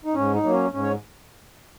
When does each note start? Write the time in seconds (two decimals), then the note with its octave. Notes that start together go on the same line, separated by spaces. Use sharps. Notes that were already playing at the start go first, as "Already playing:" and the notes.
0.05 D#4
0.15 G#2 C#4
0.34 D#4
0.43 F#3 A#3
0.53 C#4
0.72 G#2 C#4
0.83 C#5